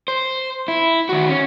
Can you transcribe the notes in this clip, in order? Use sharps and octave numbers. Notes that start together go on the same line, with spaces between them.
C5
E4
D#3 F#4
C#4